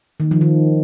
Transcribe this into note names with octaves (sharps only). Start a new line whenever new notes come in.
D#3
F3
D#3